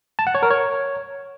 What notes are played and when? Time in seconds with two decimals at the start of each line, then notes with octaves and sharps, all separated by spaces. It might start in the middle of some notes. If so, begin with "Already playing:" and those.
0.19 A5
0.27 F#5
0.35 C#5
0.43 A#4
0.51 C#5